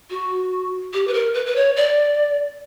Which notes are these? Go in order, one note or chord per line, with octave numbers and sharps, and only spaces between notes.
F#4
G4
B4
A#4
B4
B4
C#5
D5